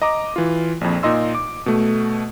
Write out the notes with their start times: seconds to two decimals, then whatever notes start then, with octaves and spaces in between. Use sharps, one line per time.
0.02 D#5 A#5 D6
0.36 E3 F4
0.81 A#1 F2
1.03 A#2 D#4 D#5 C6 E6
1.35 D6
1.66 B2 A3